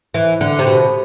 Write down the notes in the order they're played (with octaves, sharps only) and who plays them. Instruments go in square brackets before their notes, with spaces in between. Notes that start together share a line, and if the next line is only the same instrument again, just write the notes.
[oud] E3
D3
C3
B2